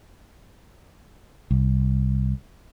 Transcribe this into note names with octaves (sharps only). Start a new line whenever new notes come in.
C2